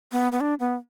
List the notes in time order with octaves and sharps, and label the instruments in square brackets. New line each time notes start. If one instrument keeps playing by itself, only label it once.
[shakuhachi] B3
B3
D4
B3